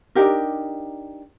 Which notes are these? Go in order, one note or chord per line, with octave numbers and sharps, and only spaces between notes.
D4 D#4 G4 A#4